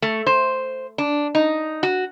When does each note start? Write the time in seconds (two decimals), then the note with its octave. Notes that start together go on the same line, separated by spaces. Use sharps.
0.02 A3
0.27 C5
0.98 D4
1.35 D#4
1.83 F#4